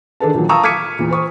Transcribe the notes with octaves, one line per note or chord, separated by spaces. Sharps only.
D#3 D4 G#4 A4 B4 A5
A#2 D#3 F3 F#3
F5 A5 A#5 C#6 D#6 E6
D6 F6 G#6 B6 C#7 D#7
E2 A#2
C5 C#6 D#6